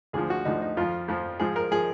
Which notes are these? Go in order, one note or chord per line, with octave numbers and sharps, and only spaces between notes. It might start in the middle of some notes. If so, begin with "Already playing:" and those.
D2 D3 F3 G#4
F#4
D2 D3 F3 D#4
D#4
F2 F3 F4
F2 F3
G#2 F3 G#4
A#4
F3 G#4